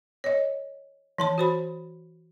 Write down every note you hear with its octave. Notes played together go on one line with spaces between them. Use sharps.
C#5 D#5
E3 A5 C6
F#4 C5 B5